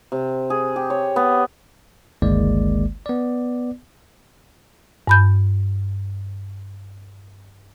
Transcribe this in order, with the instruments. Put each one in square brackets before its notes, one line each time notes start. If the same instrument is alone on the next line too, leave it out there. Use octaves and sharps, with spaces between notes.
[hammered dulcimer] C3
G#4
G4
C#5
B3
[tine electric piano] G1 C#2 D#3 G#3 A#3 D5
B3 D5
[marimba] G2 B5 G6